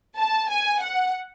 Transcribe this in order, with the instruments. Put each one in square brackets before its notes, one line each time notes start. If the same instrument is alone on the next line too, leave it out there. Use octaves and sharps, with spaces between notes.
[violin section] A5
G#5
F#5